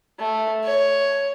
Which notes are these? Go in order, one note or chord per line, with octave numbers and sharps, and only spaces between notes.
A3
C#5